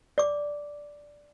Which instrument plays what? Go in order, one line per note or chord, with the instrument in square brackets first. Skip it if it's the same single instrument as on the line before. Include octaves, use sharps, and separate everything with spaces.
[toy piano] D5 D6